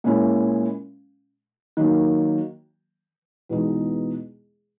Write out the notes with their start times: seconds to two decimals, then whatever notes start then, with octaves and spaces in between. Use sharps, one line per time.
0.04 A#2 G#3 C#4 E4
1.77 D#3 F#3 A#3
3.49 E2 B2 G#3 D#4